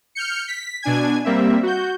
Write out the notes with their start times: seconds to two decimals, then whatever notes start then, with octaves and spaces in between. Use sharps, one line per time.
0.15 F6 G6 C#7
0.48 B6
0.82 B2 D4 G#5 G#6
1.25 G3 A#3 C4 E5
1.63 F#4 G6